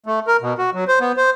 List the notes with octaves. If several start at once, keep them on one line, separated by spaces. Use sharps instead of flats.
A3
A#4
B2
F#4
F#3
C5
B3
C5